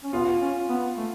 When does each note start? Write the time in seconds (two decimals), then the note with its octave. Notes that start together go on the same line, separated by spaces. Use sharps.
0.04 C#4
0.13 B3 F4
0.41 C#4
0.69 B3
0.97 A3